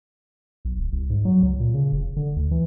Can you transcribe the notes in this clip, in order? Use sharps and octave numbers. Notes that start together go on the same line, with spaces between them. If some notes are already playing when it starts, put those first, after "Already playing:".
B1
D1
C2
G#2
F#3
C#2
A#2
C#3
F1
D3
D2
E3